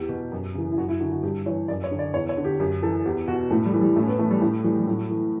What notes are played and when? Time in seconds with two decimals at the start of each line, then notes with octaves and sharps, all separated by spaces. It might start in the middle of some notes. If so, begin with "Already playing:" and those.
Already playing: E2 G4
0.09 B2
0.32 F#2
0.54 C#3 E3
0.72 E4
0.78 F#2 F#4
0.89 E4
1.00 D3 F#4
1.12 F#4
1.23 G2 G4
1.46 E3 C#5
1.68 F#2 D5
1.84 C#5
1.91 D3
1.99 D5
2.14 E2 C#5
2.29 C#5
2.37 D3
2.44 G4
2.60 F#2 G4
2.83 E3 A4
3.05 E2 G4
3.28 B2 F#4
3.51 A2 A3
3.66 G3
3.74 E3
3.81 G3
3.96 A2 A3
4.03 C#4
4.08 B3
4.19 E3 A3
4.31 G3
4.42 A2 A3
4.64 E3 G3
4.79 G3
4.87 A2 F#3
5.10 E3